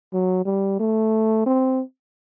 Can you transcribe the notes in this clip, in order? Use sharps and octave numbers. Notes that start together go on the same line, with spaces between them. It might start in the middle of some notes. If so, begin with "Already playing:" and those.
F#3
G3
A3
C4